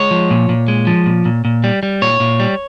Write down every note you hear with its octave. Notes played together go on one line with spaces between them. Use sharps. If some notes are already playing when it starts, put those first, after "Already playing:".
Already playing: G#3 C#5
F3
A#2
A#2
G#3
F3
A#2
A#2
A#2
G3
G3
A#2 C#5
A#2
G3